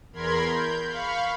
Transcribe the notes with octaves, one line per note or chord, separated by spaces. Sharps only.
E2 A#4 B5 C6 G#6
G6
F5 B5 C#6